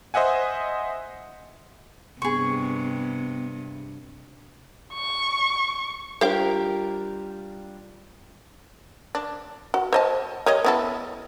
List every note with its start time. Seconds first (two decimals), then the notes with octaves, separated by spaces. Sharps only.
0.14 C5 D#5 E5 F#5 G#5
2.22 G2 C3 B3 G#4 C#6
4.94 C#6
6.21 G3 D4 F4 G4 A#4 C5 F5 G5
9.15 D4
9.74 F#4
9.93 C5 D#5 A5
10.46 G3 C#5 D#5
10.64 B3 E4 A4